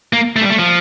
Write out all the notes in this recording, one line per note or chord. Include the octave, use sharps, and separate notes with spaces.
A#3
A3
G3
A3
F3